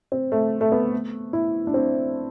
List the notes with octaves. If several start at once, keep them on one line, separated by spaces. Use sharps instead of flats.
C4
A3
A3
B3
E4
D4
C4